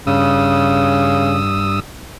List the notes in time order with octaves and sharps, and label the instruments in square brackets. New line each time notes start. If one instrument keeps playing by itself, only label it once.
[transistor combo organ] G2 D#6 E6 [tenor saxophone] C#3